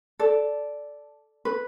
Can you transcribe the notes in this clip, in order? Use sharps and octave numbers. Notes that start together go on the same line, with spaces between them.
A4 D5
B4